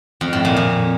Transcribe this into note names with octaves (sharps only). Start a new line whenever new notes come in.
F2
A2
A#2
F2